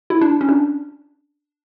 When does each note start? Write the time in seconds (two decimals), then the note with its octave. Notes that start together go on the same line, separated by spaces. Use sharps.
0.10 E4
0.21 D4
0.41 C#4
0.49 D4